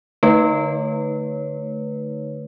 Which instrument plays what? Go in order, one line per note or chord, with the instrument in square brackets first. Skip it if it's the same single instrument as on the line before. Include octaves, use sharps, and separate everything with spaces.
[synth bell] D3 A3 D#4 B4 C#5